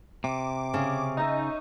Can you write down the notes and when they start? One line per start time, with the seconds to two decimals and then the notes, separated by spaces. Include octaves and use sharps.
0.24 C3 D6
0.74 C#3 C#4 F5
1.17 D#4 E5 A#5